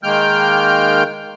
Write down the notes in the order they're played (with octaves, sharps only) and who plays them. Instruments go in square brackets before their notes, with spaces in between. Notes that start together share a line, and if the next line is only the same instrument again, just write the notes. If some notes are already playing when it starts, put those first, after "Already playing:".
[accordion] D#3 G#3 A#3 G5 F6 G6